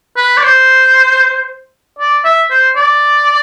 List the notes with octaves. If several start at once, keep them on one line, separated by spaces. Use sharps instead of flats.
B4
D5
C5
D5
E5
C5
D5